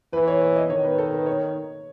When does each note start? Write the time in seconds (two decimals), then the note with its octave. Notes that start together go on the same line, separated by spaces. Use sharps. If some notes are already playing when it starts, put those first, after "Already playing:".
0.13 E3 B4
0.28 C#5
0.41 C#5
0.56 D#5
0.70 D#3 C#5
0.84 B4
0.98 A4
1.13 B4
1.26 C#5